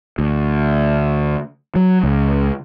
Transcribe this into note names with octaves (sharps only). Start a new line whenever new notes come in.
D2
F#3
C#2